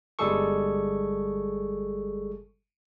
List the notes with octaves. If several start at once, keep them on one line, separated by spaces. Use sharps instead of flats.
G1 G3 G#3 G#4 A4 C#6